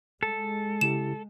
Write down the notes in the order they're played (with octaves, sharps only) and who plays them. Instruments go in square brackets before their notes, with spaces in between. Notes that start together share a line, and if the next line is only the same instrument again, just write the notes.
[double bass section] G#3 [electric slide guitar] A4
[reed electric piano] C#3 E4 G4 [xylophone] E7